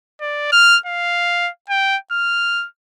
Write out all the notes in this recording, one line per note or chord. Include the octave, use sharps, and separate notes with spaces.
D5
F6
F5
G5
F6